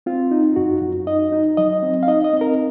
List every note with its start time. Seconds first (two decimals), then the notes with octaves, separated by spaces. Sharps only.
0.06 C4 F4
0.31 D#4
0.56 F#2 F#4
0.82 F#2
1.07 D#4 D#5
1.32 D#4
1.57 F#3 D#5
1.83 C4
2.03 F5
2.07 D#4 D#5
2.24 D#5
2.33 C4
2.41 A#4